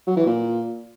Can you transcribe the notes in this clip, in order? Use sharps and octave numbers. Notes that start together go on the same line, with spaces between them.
F#3
E3
A#2